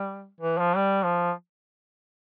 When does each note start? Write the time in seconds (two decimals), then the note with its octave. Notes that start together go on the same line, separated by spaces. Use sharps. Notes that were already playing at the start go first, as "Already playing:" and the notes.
Already playing: G3
0.41 E3
0.58 F3
0.76 G3
1.04 F3